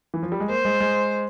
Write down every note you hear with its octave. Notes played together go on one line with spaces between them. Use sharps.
E3
F3
G3
G#3
A#3 C5
G#3
G#3